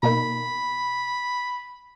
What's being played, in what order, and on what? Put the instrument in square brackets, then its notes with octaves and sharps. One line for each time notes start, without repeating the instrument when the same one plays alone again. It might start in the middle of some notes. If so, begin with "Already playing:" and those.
[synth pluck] B2 A#3 D#4 [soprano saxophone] B5